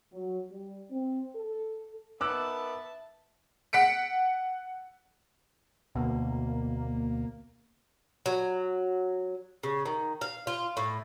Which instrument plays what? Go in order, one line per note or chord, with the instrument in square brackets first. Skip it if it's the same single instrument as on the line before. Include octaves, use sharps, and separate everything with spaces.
[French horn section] F#3
G3
C4
A4
[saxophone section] D#3 B3 [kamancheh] E5 A5 [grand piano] D6 E6 F#6
[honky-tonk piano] F#5 B6 C#7 D7
[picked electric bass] D2 B2 [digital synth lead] A#3
[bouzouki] F#3
C#3
D#3
F5
F4
A2